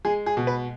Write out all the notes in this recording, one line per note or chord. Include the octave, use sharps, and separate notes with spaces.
G#3 G#4
G#4
B2
B4